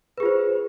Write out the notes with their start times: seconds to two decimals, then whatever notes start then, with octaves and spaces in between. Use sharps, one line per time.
0.17 B4
0.20 G#4
0.23 F4
0.25 C5